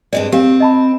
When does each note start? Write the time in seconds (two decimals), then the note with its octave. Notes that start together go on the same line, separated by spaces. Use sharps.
0.13 G2 G#3 C4 D5 D#5
0.32 C4 G4 F5
0.60 D#5 A5 B5